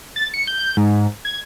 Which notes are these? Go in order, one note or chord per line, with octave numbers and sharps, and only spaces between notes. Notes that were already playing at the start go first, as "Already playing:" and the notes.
A6
C#7
G6
G6
G#2
G#6